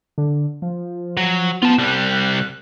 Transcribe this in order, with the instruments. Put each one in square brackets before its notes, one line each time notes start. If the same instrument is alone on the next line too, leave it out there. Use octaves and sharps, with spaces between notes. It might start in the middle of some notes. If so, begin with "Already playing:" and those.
[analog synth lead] D3
F3
[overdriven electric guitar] F#3
[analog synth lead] B3 [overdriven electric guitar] F4 A5
[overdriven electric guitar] C2 G3 [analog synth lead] F#6